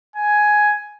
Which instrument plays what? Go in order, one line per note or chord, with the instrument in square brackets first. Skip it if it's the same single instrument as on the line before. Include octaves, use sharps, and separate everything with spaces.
[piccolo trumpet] G#5